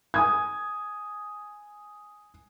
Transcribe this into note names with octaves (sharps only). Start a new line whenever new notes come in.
G#5 D#6 G#6